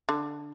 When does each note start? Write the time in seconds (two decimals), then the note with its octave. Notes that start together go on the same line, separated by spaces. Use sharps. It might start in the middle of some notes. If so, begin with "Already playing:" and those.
0.09 D3